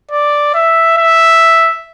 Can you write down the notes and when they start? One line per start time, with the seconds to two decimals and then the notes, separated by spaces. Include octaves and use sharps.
0.12 D5
0.54 E5
0.97 E5